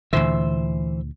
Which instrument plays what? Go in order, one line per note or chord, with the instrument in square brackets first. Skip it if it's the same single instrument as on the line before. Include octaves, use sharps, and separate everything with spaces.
[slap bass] D2 A#2 D3 [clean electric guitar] E3 C5 E5